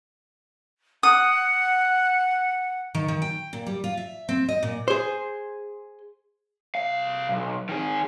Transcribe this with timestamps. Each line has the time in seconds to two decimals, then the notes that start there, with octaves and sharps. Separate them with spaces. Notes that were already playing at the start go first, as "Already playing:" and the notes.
1.03 F#5 D#6
2.95 D#3
3.08 D#3
3.22 G5
3.53 A#2
3.67 G3
3.84 F4
3.97 E5
4.29 C4
4.49 D#5
4.63 A#2
4.88 G#4 C5
6.75 C2 F5
7.29 B1
7.69 D#3 G#4